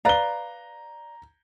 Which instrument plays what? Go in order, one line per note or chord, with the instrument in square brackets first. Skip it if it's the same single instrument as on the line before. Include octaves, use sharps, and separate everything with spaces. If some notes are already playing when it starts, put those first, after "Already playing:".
[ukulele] B4 D5 F5 [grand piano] A#5 G7